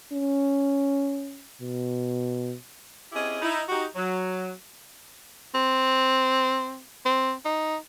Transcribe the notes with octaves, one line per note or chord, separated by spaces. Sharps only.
C#4
B2
C4 C#4 E4 G4 G#4 D#5
D#4 E4
D#4 F#4 G4
F#3
C4
C4
D#4